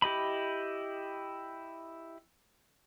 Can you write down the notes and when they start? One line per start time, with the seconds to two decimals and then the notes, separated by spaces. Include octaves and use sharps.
0.02 E4 G4 D#5 B5